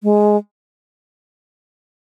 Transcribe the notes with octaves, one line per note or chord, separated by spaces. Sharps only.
G#3